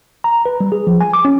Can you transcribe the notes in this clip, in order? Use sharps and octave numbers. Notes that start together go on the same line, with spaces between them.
A#5
B4
G3
G#4
F3
G#5
D6
C#4